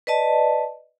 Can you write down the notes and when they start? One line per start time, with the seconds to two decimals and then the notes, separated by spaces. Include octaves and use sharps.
0.07 B4 D5 D#5 A5